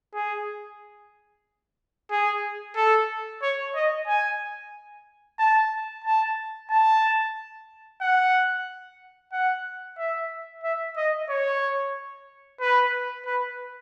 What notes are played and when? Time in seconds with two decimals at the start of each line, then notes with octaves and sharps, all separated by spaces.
0.14 G#4
2.11 G#4
2.76 A4
3.42 C#5
3.75 D#5
4.07 G#5
5.39 A5
6.04 A5
6.70 A5
8.02 F#5
9.33 F#5
9.98 E5
10.64 E5
10.97 D#5
11.29 C#5
12.60 B4
13.26 B4